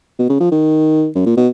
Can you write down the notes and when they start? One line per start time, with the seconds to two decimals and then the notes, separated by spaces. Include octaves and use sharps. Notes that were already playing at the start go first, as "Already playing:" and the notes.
0.19 B2
0.29 C#3
0.40 F3
0.51 D#3
1.15 F#2
1.26 A#2
1.37 B2